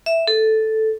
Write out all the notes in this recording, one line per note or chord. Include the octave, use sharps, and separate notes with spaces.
E5
A4